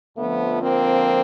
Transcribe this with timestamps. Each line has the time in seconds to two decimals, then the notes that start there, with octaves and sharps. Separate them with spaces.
0.17 F2 D3 F3 A3 B3
0.63 A#3 C4